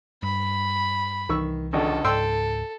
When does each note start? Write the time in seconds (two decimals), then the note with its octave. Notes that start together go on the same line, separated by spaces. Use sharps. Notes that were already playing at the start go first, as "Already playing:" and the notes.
0.23 G2 B5
1.29 C2 D#3 E3 C#6 E6
1.73 G#1 C#2 D3 A4
2.04 C#2 G#2 A4 G5 C6 E6